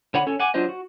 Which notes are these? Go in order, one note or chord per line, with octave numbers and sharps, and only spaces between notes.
D3 C#5 F#5 B5
C#4 A4 C#5
F#5 G#5 D6
F#3 D4 F4 C5 D#5
F#4